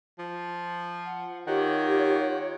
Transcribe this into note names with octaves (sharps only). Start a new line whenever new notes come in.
F3
F#5
D#3 F4 G4 C#5 F#5 G5